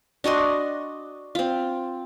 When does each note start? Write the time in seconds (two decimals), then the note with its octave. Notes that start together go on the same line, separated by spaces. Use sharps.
0.24 D4 F#4 D#5 C6
1.35 C4 F4